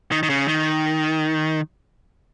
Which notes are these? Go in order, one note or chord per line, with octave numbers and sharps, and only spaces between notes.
D#3
D#3
C#3
D#3